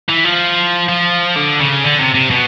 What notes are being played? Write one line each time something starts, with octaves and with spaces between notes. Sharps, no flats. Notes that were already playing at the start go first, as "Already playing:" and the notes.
E3
F3
F3
D3
C#3
D3
C3
C3
B2